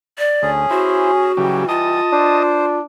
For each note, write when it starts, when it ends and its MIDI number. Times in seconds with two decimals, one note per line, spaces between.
0.19 0.50 74
0.42 0.66 38
0.42 1.32 61
0.42 1.32 68
0.71 1.12 64
0.71 1.68 66
0.71 1.12 72
1.37 1.65 49
1.37 2.00 52
1.37 1.65 54
1.37 2.00 55
1.37 1.65 67
1.69 2.79 65
1.69 2.43 75
1.69 2.43 81
1.69 2.43 87
2.12 2.82 62
2.12 2.66 72